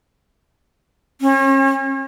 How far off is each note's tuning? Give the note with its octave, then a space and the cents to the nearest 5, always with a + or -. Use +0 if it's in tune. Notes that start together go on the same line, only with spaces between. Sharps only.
C#4 -40